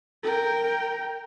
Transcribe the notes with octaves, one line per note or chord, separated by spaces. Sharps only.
A#4 G5